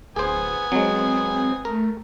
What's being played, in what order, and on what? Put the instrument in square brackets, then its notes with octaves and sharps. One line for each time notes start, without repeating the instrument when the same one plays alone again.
[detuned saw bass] D1 [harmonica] B3 G#5 D#6 [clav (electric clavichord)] G#4 C5
[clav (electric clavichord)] F#3 G#3 [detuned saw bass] C4
[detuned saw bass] A3 [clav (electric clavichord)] A#4